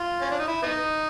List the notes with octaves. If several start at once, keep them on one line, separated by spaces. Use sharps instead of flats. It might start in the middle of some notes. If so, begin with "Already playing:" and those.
Already playing: F4
C#4
D4
D#4
E4
B3 D#4